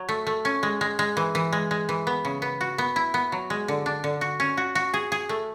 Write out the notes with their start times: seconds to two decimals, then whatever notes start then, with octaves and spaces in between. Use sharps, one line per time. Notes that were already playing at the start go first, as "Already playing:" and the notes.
Already playing: F#3
0.09 A3
0.27 A3
0.45 C#4
0.63 G#3
0.81 G#3
0.99 G#3
1.17 E3
1.35 E3
1.52 G#3
1.71 G#3
1.89 E3
2.07 B3
2.25 C#3
2.42 B3
2.61 F#4
2.78 B3
2.96 E4
3.14 B3
3.32 F#3
3.50 G#3
3.68 D3
3.86 D4
4.04 D3
4.21 F#4
4.40 C#4
4.57 F#4
4.75 F#4
4.94 G#4
5.12 G#4
5.29 A3